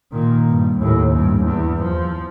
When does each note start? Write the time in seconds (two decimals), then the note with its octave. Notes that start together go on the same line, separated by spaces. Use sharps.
0.12 A#2 D#3
0.48 G2
0.80 D#2 A2
1.11 G2
1.44 E2
1.83 F3